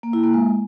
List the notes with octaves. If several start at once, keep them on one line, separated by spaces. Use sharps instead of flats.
A#3
E4
A#3
G#3